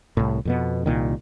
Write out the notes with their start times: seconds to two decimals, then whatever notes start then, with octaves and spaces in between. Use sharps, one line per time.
0.17 C2 A2
0.45 F2 B2 B3
0.86 C2 A#2 D#3